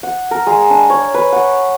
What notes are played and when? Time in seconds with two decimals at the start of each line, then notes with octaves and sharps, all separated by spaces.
0.03 F#5
0.31 A#4
0.47 G#3
0.70 D4
0.90 C#5
1.14 B4
1.32 F#5